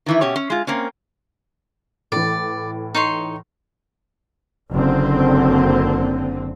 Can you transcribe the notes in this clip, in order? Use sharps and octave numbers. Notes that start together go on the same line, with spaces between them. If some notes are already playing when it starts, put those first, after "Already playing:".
D#3 E3 E4
B2 C#4 G4 C#5
C#4
G#3 F4
A#3 C4 C#4
A2 E3 D5
D#4 C#5 C6
F#1 D3 C4